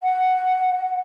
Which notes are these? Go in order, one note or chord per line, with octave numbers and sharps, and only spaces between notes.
F#5